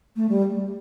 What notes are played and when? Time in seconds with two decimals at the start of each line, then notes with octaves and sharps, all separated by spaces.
0.16 A3
0.29 G3